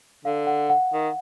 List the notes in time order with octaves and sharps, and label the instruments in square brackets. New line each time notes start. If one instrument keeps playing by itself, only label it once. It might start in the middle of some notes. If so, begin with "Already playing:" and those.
[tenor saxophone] D3 [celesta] F5
[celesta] F#5
F#5
[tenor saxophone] D#3